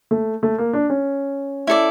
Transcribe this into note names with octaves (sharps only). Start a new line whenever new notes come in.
A3
A3
A#3
D4
C#4
E4 A4 D5